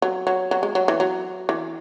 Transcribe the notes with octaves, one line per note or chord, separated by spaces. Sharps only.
F#3
F#3
F#3
G#3
F#3
E3
F#3
E3